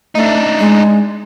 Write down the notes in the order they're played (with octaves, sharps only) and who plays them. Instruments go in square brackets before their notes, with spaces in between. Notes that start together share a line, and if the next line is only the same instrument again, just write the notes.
[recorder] A3 [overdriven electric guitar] D4 D#4
[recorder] G#3